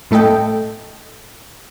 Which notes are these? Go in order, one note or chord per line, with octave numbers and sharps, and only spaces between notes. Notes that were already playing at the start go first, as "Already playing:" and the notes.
A2 A3 A4 D#5 G5